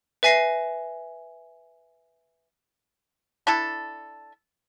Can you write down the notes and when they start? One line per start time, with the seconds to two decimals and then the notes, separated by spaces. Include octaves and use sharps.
0.23 B4 E5 G#5 A#6 C7
3.47 D4 E4 A4